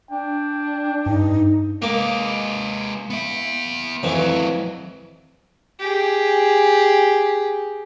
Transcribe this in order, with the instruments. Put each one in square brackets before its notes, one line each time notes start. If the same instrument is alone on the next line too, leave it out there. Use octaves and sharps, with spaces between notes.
[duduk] D4 [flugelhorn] G5
[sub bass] G2 [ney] D#4
[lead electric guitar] G#3 B4 [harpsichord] A#3 D6
[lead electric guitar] B3 E5
[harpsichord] F2 E3 [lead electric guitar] D#3 F#3
[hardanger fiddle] G4 G#4